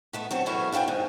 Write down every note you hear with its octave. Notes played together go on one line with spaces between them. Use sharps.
D#3 A3 B3
F#3 C4 A4
E2 B2 F#3 A3 C#4 E4
D4 F4 A4 G5 G#5
G#2 D#3